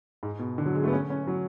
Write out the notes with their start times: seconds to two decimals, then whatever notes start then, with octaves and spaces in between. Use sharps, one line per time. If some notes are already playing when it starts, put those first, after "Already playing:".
0.23 G#2
0.39 B2
0.58 D3
0.66 F#3
0.75 G#3
0.84 A3
0.88 B3
0.93 C#4
1.10 C#4
1.27 F#3